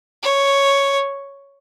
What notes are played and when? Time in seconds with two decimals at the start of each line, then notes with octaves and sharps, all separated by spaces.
0.23 C#5